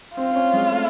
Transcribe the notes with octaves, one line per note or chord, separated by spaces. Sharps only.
C4 F4
C4
C#4
G#3
A3